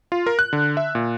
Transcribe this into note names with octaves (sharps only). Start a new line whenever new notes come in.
F4
A#4
F#6
D3
E5
A#2